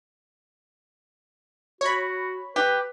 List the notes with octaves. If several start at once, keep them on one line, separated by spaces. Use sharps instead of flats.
F#4 C#5 B5
G4 B4